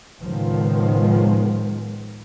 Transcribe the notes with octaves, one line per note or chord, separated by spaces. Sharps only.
C#2 A2 D#3 F3 G#3 B3